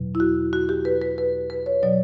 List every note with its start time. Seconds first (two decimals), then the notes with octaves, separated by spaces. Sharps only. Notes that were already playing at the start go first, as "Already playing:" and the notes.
Already playing: E2 B2 F#3
0.15 E4
0.20 F#4
0.53 F#4
0.69 G4
0.85 B4
1.01 B4
1.18 B4
1.50 B4
1.66 C#5
1.83 B2 F#3 D5